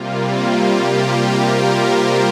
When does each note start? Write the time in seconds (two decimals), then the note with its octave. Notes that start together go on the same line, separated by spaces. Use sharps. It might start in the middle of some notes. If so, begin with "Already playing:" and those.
Already playing: C3 G3 A#3 F4
0.15 F4
0.50 G4
1.19 A#4
1.89 C5